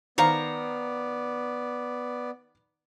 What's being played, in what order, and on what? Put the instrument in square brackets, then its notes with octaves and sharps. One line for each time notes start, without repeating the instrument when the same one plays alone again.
[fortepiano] D#3 C5 F5 [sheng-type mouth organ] B3 D5 [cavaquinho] A#5 C#6